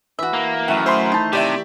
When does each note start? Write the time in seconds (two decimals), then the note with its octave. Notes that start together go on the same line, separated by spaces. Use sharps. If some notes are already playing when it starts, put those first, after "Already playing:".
0.19 E3 F#4 E5
0.34 A#3 A#5
0.68 F#2 D#3 E3 A3 F#5
0.86 C5 B5 C6
1.12 D#4 A5
1.33 C3 G4 D5 E5